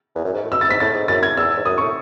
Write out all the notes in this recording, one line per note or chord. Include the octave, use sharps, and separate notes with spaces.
E2
F#2
G#2
A2
B2 E6
A6
G#2 B6
A2 A6
G#2
F#2 A6
G#6
E2 E6
G#2
F#2 D#6
A2 C#6